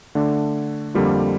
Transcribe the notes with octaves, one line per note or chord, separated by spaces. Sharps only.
D3 A3 D4
F2 D3 G3 A#3 F4